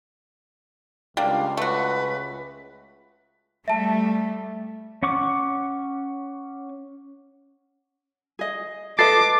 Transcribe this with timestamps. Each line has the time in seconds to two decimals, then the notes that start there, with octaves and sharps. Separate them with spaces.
1.17 C#2 G3 A#3 D4 F5
1.57 A3 F#4 B4
3.68 G3 A3 E5 A5
5.03 C#4 F#5 C#6 D6
8.39 G#4 D#5
8.99 A4 B4 D#5 D6 A6 C7